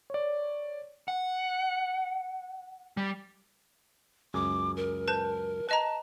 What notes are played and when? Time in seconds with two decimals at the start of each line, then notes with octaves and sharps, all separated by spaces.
0.10 C#5 D5
1.08 F#5
2.97 G3
4.34 C#2 F#2 G#4 D6
4.77 A#4
5.08 B4 A5 G6
5.69 B4 D#5 A5 A#5